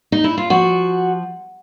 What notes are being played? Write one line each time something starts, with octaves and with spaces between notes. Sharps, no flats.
D#4
E4
F4
F3 F#4